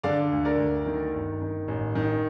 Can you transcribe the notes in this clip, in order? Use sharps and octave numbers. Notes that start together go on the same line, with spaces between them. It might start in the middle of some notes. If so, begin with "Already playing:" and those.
D3 D5 F5
D2
A#4 D5
D2
D#3
G1
D#3
A1
D#3